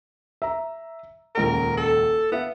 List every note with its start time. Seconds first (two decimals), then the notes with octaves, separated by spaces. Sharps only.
0.42 E5 A#5
1.35 D#1 C#2 A#4 D7
1.77 A4
2.32 B3 E4 E5 F5